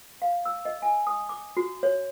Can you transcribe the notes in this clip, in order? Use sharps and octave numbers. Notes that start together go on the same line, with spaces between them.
F5
E6
D#5
G#5
D#6
D6
F#4
C#5